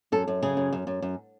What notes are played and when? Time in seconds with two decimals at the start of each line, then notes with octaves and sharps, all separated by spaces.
0.12 F#2 A4
0.27 F#2
0.42 C#3 G#4
0.57 F#2
0.73 F#2
0.87 F#2
1.02 F#2